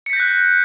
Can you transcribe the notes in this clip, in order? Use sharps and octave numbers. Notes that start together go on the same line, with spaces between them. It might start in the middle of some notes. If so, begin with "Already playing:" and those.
F#6 G6 A#6 B6 C#7